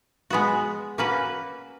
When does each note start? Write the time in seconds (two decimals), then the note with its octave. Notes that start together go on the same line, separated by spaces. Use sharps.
0.30 G#3 B3 F#4
0.98 A#3 C#4 F#4 B4